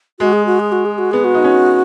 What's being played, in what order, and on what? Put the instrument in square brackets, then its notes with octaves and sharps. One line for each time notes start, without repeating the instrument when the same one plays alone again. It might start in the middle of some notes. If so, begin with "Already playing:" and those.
[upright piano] G#3 [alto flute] F#4
[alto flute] G#4
F#4
G#4
F#4
G#4
F#4
[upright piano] B3 [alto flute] G#4
[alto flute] F#4
[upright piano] D#4
C#4